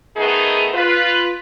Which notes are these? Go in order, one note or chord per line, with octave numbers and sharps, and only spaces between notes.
D#3 A3 B3 D#4 G#4
F4 B4